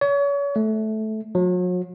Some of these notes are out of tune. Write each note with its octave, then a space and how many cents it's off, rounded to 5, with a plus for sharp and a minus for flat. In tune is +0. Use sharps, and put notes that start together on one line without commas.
C#5 +35
A3 -15
F#3 -40